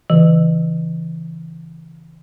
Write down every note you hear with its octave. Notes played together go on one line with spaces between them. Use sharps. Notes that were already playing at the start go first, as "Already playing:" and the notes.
C#3 E3